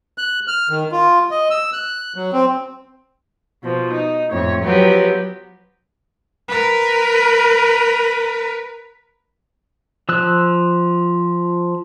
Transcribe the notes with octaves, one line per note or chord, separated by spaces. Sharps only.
F#6
F6
D#3
F4
D#5
E6
F#6
F#3
C4
B2 F3
D#4
F2 A2 C#5
F3 F#3 B3 G4
A#4 B4
F3 E6 F#6